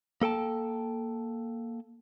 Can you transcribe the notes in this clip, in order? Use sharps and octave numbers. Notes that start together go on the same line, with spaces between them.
A#3 A4 G5 A5